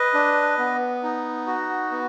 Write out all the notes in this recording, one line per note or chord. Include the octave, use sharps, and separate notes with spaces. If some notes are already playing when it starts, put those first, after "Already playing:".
Already playing: B4 D#5
D4
B3
D#4
F#4
B3